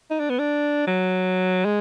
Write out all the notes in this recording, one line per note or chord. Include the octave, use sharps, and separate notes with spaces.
D#4
D4
B3
D4
F#3
G#3